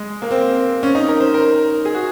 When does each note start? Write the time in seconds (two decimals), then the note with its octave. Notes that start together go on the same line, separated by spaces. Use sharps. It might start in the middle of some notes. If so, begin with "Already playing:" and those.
Already playing: G#3
0.22 A#3
0.31 C4
0.83 C#4
0.95 D#4
1.08 A#4
1.20 C5
1.34 A#4
1.85 G#4
1.95 F#4